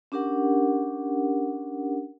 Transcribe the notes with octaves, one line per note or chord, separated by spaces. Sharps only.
C#4 D4 G4 A#4 F#5